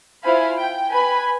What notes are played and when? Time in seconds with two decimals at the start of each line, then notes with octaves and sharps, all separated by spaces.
0.23 E4 F4 C5 F5 G#5 B5
0.57 G5
0.90 B4 G#5 B5